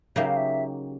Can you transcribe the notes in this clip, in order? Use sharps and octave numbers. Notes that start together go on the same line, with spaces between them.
C#3 F#3 A#3 D#4 G4 E5
F5
E5